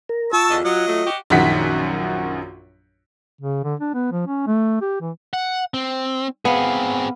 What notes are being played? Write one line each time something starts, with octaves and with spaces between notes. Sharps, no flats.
A#4
F4 A5 C#6 E6
E2 D3 D#5
F#3 D#5
F#3 A3
F#4 G4
A#1 F#2 D#3 F#5 B6
C#3
D3
D4
B3
F3
C#4
A3
G4
E3
F#5
C4
B3 C4 G#4 F5